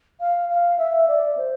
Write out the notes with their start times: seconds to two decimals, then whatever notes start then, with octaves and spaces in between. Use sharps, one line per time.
0.20 F5
0.49 F5
0.78 E5
1.08 D5
1.37 C5